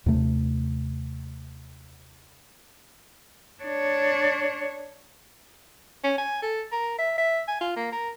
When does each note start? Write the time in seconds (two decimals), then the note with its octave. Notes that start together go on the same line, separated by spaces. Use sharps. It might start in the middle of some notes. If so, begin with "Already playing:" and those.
0.06 D#2 C3 A3
3.63 D4 C#5
6.04 C#4
6.18 G#5
6.42 A4
6.72 A#4
6.99 E5
7.18 E5
7.48 G#5
7.61 F4
7.76 A#3
7.92 A#4